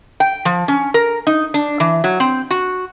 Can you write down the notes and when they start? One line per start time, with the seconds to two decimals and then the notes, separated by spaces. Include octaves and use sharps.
0.20 G5
0.45 F3
0.68 C#4
0.94 A#4
1.27 D#4
1.54 D4
1.80 E3
2.04 F#3
2.20 C4
2.51 F#4